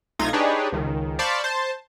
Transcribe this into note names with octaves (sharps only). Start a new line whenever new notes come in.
C2 A3 D#4 F4 G#6 A#6
D4 D#4 G4 G#4 B4 C#5
C#2 D#3
C5 D5 F5 A5 B5 C#6
C5 A5